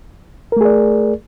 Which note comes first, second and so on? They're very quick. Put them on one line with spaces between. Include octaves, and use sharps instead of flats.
A#4 A3 G#4 D5